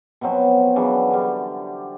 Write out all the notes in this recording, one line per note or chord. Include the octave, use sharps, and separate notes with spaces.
B2 F3 F#3 C4
C#3 E3 F#3 D4
D3 G3